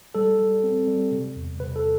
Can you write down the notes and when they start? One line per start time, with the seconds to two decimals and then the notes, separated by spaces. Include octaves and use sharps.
0.15 G3 A4
0.39 G3
0.64 C4
0.87 G3
1.12 C3
1.36 E2
1.60 C3 B4
1.76 A4